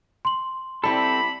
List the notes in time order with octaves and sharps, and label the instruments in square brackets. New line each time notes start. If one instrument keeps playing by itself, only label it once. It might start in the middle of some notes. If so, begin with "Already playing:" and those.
[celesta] C6 F#7
[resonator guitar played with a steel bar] G3 E4 G4 [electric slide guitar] C4 A4 [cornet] B5